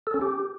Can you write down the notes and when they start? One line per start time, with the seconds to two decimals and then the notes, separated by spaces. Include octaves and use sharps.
0.07 A4
0.14 C#4
0.21 G4